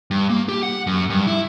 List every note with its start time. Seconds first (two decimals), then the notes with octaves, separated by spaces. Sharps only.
0.11 G2
0.30 A#3
0.49 G4
0.63 F#5
0.87 F#2
1.10 G2
1.27 E4